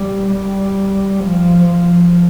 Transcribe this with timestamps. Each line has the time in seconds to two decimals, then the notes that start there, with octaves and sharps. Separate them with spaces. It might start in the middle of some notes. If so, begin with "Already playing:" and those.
Already playing: G3
0.31 G3
1.20 F3
1.65 F3